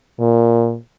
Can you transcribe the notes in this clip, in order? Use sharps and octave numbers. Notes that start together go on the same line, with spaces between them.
A#2